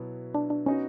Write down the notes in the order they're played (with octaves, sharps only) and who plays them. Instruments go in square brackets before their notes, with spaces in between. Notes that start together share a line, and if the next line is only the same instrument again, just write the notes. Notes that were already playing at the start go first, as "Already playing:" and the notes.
Already playing: [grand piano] B2 F#3 B3 E4
[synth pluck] D4
D4
[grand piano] B3 D#4 F#4 [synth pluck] C#4